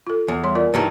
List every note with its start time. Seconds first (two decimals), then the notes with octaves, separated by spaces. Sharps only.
0.07 F4 A4
0.28 E2
0.43 G3 C#5 C6
0.55 F4 A#4 D5
0.74 G2 D#3 E3